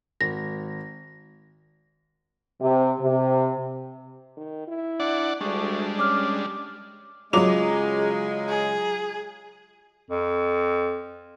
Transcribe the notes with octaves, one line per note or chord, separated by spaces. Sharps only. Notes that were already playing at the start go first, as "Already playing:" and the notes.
G#1 A#6
C3
C3
D#3
E4
D4 D5 F#5
D2 G3 G#3 D4 C#6
C#4 D6 F6
C#3 F#3 G#3 F4 C#5 D6 F7
G#4
F2